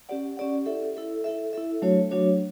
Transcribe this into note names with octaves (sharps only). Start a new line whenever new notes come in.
C#4 G4 D5 F#5
C#4 G4 D5 F#5
E4 A4 E5
E4 A4 E5
E4 A4 E5
E4 A4 E5
F#3 A3 D4 F#4 C#5
F#3 A3 D4 F#4 C#5